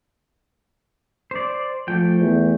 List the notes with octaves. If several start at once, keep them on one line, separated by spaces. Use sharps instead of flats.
C5 D5
F3 A3 G5
E2